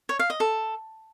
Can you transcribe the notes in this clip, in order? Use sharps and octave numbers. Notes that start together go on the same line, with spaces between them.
C#5
F5
D#5
A4